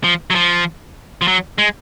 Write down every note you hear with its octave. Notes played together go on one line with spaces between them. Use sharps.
F3
F#3
F3
F3
F#3
G#3